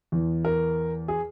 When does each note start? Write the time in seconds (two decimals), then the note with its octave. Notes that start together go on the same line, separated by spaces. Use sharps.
0.12 E2 E3
0.45 A#4
1.08 G#4